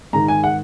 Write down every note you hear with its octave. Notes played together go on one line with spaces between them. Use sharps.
G#2 D#3 A#5
G#5
F#5